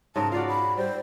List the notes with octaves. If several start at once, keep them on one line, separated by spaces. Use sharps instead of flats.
G#2 C#3 A#4 A5
F4 F#4 D5 F5
B5
G3 C5